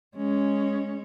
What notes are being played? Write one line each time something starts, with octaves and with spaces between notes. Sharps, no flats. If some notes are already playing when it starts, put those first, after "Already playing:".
G#3 C#4